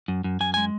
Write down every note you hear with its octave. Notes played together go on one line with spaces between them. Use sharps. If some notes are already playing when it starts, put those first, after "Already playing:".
F#2
F#2
F#2 G#5
G#3 G#5